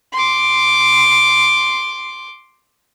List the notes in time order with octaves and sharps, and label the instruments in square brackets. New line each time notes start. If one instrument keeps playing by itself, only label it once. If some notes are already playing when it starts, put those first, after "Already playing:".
[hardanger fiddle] C6 D6